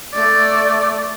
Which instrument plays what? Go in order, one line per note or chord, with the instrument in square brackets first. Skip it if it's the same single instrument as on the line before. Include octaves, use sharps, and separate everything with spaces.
[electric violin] A3 D5